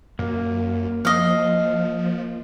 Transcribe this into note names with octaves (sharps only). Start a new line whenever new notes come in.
F#2 A#3
F3 D#5 F5